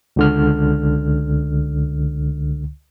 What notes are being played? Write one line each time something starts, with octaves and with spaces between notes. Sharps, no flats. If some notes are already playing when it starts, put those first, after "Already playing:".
C#2 D3 F6